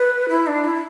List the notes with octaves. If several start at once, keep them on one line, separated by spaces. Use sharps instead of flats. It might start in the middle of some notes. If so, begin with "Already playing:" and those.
Already playing: B4
E4
D4
E4